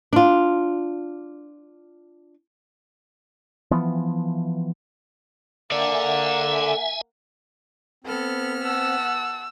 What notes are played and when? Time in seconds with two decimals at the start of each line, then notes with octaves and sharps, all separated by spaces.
0.13 D4 F4
3.71 E3 F3 B3
5.71 A#3 A4 D5 E5 F#5 G#5
8.04 B3 C4 A4 B5 F6
8.63 F#5 A5 E6